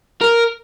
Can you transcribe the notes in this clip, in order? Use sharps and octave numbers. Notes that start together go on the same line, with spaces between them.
A#4